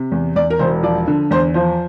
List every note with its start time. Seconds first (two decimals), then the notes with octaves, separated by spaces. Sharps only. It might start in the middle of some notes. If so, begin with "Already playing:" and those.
Already playing: C3
0.12 E2
0.36 E2 D5
0.50 A#4
0.59 E1 C5
0.83 F3 D5
1.08 D3
1.31 E2 C5
1.54 F3 C5